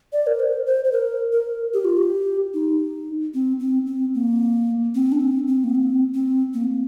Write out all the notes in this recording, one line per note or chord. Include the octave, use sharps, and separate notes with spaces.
D5
A#4
C5
C5
C5
A#4
A#4
G4
F4
G4
D#4
C4
C4
C4
A#3
C4
D4
C4
C4
A#3
C4
C4
A#3